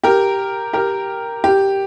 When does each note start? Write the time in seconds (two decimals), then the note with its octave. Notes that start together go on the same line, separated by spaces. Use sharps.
0.04 G4 A#4
0.73 G4 A#4
1.44 G4